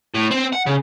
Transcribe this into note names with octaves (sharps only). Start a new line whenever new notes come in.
A2
C4
F#5
C#3